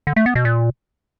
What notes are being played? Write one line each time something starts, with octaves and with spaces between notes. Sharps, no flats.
D3
A3
B3
B2
A#2